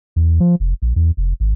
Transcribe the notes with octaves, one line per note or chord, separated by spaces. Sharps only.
E2
F3
F1
A#1
E2
F1
G#1